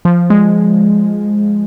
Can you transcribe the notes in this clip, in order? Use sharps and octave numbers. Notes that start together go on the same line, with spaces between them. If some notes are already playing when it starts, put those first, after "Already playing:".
F3
G#3